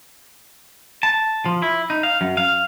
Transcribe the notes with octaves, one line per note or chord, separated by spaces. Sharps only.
A5
F3
E4
D#4
F5
F#2
F5